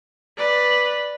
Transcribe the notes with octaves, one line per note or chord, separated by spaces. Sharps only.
B4 D5